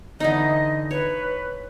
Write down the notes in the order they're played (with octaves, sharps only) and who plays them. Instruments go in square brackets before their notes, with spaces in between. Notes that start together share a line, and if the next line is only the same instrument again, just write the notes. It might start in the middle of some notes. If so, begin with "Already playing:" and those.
[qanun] D3 E3 D#4 [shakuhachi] D#5
[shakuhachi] B4 [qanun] C#5